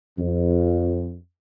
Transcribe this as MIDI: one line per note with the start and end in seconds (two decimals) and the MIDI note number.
0.18 1.13 41